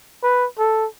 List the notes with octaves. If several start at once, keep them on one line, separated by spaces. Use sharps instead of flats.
B4
A4